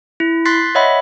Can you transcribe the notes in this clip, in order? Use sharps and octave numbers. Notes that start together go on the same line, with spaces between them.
E4
C6 F#6 A6 B6 C7
C#5 D#5 E5 F#5 B5